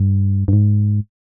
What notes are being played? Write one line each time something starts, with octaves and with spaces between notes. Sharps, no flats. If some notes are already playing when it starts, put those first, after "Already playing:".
Already playing: G2
G2
G#2